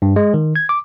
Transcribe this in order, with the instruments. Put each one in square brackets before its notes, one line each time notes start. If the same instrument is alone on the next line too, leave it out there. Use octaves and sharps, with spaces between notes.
[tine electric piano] G2
G#3
D#3
G#6
D6